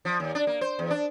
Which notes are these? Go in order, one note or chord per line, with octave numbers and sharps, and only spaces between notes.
F3
D#2
D4
A#3
C5
E2
D4